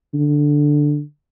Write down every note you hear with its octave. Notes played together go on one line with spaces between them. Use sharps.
D3